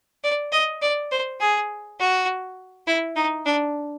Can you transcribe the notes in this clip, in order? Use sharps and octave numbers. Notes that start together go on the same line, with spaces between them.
D5
D#5
D5
C5
G#4
F#4
E4
D#4
D4